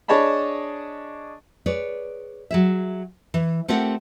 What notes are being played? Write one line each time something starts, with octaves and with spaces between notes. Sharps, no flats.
D4 G#4 C#5 D#5 A5 B5
G#4 B4 C#5 D5
F#3 G#4 E5
E3
A3 C4 F4 G4 A#4 F#5